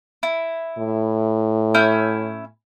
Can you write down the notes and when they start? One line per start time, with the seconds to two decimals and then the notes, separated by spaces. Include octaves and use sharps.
0.23 E4
0.78 A2
1.74 C#4 E4 G6